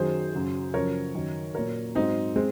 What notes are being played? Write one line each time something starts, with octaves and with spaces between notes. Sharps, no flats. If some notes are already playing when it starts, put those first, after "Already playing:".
Already playing: F#2 D#3 F#3 G#4 C5
F#2 C#3 F#3
F#2 C#3 F3 A#4 C#5
F#2 D#3 F#3
A#2 F#3 A#4 C#5
G#2 F#3 C4 D#4
G#3 C4